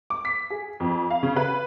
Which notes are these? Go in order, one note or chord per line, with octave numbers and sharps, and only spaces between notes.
D6
B6
G#4
F2
F5
C#3
B4